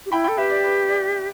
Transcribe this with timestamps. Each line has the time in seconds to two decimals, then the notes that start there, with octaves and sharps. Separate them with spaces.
0.06 G4
0.12 E4 G5 B5
0.24 A4 G5 B5
0.37 G4 B4 E5
0.50 D5
0.64 B4
0.88 D5